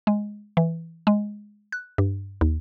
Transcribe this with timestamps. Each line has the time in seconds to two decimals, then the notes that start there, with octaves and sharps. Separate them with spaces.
0.07 G#3
0.57 E3
1.07 G#3
1.72 F#6
1.98 G2
2.41 D#2